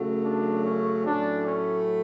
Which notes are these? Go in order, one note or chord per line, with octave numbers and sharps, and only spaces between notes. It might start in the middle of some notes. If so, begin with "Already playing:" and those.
Already playing: F#2 C#3 F#3 A3
D4
C#4
A2 F#3 A3 C#4 D4
C#4